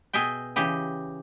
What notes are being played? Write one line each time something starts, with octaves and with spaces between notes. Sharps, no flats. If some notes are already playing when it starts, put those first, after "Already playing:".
B2 G#4 D#5 E5 G5
C#3 E3 G4 D#5